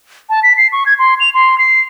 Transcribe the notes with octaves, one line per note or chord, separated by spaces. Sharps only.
A5
B6
C7
C#6
G#6
C6
F7
C6
C7